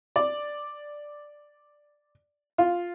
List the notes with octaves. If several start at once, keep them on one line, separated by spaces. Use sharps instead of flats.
D5
F4